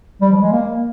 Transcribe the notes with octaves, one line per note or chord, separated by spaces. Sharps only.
G3
F3
G#3
A#3